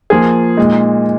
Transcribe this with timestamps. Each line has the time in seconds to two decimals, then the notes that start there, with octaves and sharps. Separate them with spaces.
0.10 F3 A#3 F4 G#4
0.57 A#2 G#3 D#4